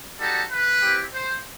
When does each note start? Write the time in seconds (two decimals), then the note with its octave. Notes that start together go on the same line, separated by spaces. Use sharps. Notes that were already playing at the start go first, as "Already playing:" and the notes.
0.19 G3 D#4 F#4 A4
0.50 B4
0.82 C4 E4 G4
1.13 C5